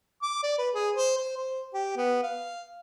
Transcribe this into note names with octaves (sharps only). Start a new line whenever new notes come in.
D6
D5
B4
G#4
C5
C5
C5
G4
B3
F5